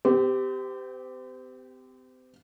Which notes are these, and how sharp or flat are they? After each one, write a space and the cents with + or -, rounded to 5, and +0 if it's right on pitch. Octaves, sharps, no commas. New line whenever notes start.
C4 -40 G4 +0